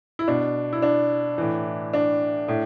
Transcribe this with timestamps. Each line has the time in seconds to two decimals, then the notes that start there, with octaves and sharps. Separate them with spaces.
0.19 E4
0.28 B2 D4
0.73 E4
0.82 D4
1.38 A2 E3
1.93 D4
2.48 A2